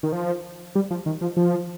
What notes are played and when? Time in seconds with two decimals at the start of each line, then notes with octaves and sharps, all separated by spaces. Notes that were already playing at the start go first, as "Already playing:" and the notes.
0.03 D#3
0.12 F3
0.75 G3
0.91 F3
1.06 D#3
1.21 F3
1.37 F3